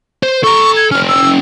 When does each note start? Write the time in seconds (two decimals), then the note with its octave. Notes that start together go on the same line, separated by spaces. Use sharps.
0.23 C5
0.44 A4 A#5 C#6
0.77 G#6
0.91 A#3 C#4 F6
1.08 E6